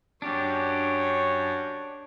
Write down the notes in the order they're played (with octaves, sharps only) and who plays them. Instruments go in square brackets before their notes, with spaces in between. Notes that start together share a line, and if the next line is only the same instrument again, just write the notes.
[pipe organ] F#2 [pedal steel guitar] D4 G4 [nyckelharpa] C#5